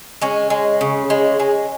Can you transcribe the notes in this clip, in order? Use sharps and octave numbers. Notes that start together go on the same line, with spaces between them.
G#3 C#4
G#3
C#3
G#3
G#3